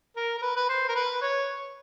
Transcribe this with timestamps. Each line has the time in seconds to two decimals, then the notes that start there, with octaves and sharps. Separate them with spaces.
0.16 A#4
0.38 A#4
0.42 B4
0.56 B4
0.69 C5
0.89 A#4
0.95 B4
1.22 C#5